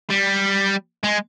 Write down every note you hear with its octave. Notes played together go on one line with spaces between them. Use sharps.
G3
G#3